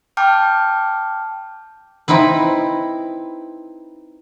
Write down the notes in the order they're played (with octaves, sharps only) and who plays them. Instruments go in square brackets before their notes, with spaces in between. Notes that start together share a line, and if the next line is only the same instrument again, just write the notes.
[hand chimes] G5 A5 D6 F6 G6
[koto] C4 D#4 E4 B4